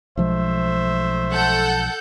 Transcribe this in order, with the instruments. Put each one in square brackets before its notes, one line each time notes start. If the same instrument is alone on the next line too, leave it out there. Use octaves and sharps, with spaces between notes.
[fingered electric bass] B1 F3 G#3 [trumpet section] A3 C5 E5
[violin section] A4 F#5 G6